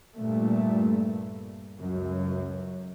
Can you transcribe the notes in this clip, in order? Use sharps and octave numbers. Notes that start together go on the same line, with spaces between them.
G2 A#2 A3
C#2 F#2